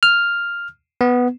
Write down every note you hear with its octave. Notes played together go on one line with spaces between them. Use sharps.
F6
B3